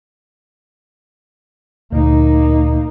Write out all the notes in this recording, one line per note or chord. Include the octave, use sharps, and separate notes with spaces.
D2 A#2 A#3 D#4